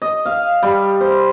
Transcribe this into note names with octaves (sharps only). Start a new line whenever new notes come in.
D#5
F5
G3
C5